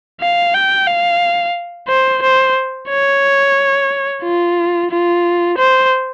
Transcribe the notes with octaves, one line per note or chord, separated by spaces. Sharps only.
F5
G5
F5
C5
C5
C#5
F4
F4
C5